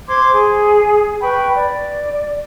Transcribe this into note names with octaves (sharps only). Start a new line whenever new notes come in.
C5 C6 D6 G#6
G#4
B4 G5 B5 C#6
D5